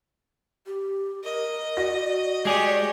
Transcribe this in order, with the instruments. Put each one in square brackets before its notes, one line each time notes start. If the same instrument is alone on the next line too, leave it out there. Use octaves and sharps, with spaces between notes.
[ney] G4
[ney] A#4 [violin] D#5
[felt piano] F#4 A#6 [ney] D5
[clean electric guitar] G#3 G#4 [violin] G4 C#5 [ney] D5